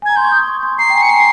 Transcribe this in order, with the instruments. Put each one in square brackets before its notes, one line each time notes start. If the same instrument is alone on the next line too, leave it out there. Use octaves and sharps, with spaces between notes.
[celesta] G#5
[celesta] A#5 [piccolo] G#6
[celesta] C6 [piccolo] G6
[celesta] C#6
D#6
C#6
C6
[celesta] A#5 [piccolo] C7
[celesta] G5
G#5
[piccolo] C#7
[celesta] A#5 [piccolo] C7